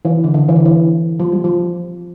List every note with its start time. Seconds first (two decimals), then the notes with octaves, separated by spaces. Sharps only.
0.05 E3
0.24 D3
0.34 D3
0.49 E3
0.56 D3
0.65 E3
1.20 F3
1.32 G3
1.44 F3